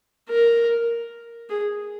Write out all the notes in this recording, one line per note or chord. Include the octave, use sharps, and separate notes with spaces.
A#4
G#4